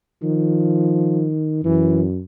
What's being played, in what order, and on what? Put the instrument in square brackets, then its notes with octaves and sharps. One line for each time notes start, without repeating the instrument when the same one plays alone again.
[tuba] D#3 [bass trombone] F3
[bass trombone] F#2 [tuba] E3